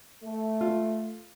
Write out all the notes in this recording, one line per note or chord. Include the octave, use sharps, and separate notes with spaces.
A3
F4